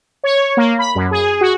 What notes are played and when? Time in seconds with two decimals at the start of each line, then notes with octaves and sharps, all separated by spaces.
0.24 C#5
0.57 A#3
0.79 B5
0.95 F#2
1.11 G#4
1.41 F#4